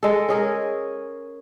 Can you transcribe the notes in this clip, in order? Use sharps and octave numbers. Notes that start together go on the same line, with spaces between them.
G#3 A4
C#4 G#4 A#4